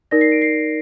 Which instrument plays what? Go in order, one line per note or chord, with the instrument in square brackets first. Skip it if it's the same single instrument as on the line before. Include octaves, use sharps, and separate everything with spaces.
[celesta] D#4 A#4 D5 A#6
C7
D7
C7